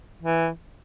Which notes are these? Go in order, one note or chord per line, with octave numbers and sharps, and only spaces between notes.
E3